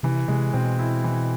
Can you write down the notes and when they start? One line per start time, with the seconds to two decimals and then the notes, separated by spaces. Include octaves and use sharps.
0.03 C3 E3
0.28 C3 G#3
0.54 B2 C4
0.79 E4
1.04 E3